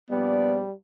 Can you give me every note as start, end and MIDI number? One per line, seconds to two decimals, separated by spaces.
0.11 0.62 34
0.11 0.62 53
0.11 0.72 55
0.11 0.63 59
0.11 0.62 74